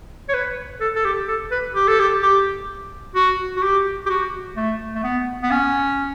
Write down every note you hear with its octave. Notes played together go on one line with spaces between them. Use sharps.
C#5
B4
A4
A4
G4
A4
B4
G4
A4
G4
G4
F#4
F#4
G4
G4
F#4
A3
A3
B3
B3
C#4